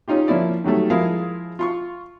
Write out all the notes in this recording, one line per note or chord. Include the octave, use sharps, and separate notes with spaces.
C#4 D#4 F4 G4
F3 A#3 C#4 E4 D5
D#3 F#3 G3 A3
F3 G#3 E4 G#4 A#4 F5
F4 C6 C#6